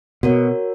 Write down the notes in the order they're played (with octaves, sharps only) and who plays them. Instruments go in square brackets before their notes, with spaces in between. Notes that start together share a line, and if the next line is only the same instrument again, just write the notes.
[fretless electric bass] B2 [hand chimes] F#4 A#4 C#5